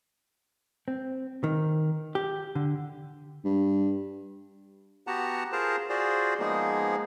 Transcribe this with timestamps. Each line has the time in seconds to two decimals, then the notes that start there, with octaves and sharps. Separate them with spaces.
0.88 C4
1.44 D#3
2.15 G4
2.55 D3
3.45 G2
5.07 B3 F#4 G4 F#5 A5 A#5
5.52 F4 G#4 A#4 C5 A5 A#5
5.90 F4 F#4 G#4 C5 D5
6.39 F3 G#3 A#3 B3 D#4 G#4